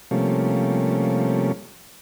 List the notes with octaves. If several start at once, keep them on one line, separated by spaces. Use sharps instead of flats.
C3 F3 G3 A3 A#3 C#4